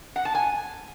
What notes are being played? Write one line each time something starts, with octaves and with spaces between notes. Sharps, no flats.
F#5
A5
G#5